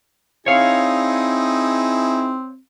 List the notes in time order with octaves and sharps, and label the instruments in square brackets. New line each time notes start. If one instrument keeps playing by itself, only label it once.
[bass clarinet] C4 [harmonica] D#4 E4 G#4 [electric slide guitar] C#5 F5